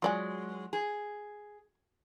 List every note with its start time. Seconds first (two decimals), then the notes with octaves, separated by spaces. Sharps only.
0.02 F#3 G#3 F4 D5 G#5
0.73 G#4